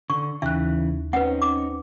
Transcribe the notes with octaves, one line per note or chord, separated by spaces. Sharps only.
D3 C#6
D#2 C#3 E3 E5 F#6
C4 C#4 D#4 B4 F#5
D6